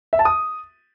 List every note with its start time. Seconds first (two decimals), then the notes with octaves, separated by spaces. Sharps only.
0.13 E5
0.19 A5
0.25 D#6